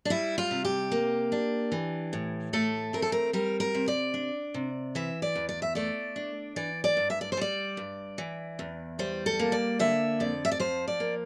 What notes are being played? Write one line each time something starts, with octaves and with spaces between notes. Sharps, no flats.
D4
G3 E4
F4
C3
G4
A#3
D4
E3
A2
A3 A4
C4 A#4
A4
A#4
G3 A#4
A#4
C3
D5
D4
C3
E3 E5
D5
E2
D5
E5
A3 D5
D4
E3 D5
D5
G2
E5
D5
C5
G3 D5
G2
E3
E2
G3 C5
A4
A#3
D5
D3 E5
F2 D5
E5
D5
F3 C5
D5
A#3